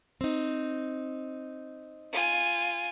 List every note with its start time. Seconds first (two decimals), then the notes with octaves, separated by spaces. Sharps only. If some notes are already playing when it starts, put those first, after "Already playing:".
0.21 C4 D#4
2.13 F4 G#5